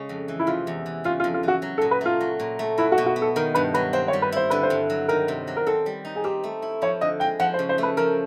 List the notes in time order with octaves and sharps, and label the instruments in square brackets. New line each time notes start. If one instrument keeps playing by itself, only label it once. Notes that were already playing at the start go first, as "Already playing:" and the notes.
Already playing: [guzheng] C#3 G#3 C#4
F2
E3
[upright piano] E4
[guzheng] C3 [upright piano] F4
[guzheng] E2
E3
[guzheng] C#3 [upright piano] F4
[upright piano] F4
[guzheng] F2
[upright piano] F4
[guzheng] E3 [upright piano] F#4
[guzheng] F#3
[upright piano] A4
[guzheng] A#2
[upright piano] B4
[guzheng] A3 [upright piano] F4
[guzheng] F#3
A#2
A3
[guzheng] F#3 [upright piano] E4
[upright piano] F#4
[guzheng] B2
[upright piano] F#4
[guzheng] B3
[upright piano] A4
[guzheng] D#3 [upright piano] A#4
[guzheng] G2 [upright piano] B4
[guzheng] F#3 [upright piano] B4
[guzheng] C4 [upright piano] C5
[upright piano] C#5
[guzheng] G3
[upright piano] B4
[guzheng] E4 [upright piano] C5
[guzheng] D3 [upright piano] B4
[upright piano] C5
[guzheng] G2
F#3
[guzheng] D#3 [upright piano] A#4
[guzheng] C3
F#3
[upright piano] A#4
[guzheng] C4 [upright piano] A4
[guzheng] G3
D#4
[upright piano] G#4
[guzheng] C4 [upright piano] G4
[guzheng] A3
E4
[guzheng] F3 [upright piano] C#5
[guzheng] D3 [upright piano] D#5
[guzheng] G#3 [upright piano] G5
[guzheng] F3 [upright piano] F#5
[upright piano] C5
[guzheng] C#3
[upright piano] C5
[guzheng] A3 [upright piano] B4
[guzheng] F3 [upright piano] A#4